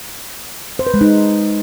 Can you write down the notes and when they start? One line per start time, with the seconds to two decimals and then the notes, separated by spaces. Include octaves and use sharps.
0.79 C5
0.87 B4
0.94 G#3
1.01 D#4